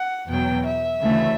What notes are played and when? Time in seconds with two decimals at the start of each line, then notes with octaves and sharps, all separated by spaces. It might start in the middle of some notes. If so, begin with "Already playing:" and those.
Already playing: F#5
0.29 E2 B2 F#3 G5
0.66 E5
1.02 D2 C#3 E3 A3